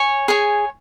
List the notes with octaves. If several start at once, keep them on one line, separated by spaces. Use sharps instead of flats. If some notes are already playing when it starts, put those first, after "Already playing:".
Already playing: C#5 G#5
G#4 C#5 G#5